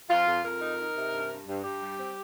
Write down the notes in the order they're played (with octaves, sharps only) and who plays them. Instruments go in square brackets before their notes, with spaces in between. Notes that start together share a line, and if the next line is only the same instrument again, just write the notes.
[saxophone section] F2 F4
F2
F2 A#4
D#4
D#4
C3
G2
G2
G2
G2 G4
G3
C4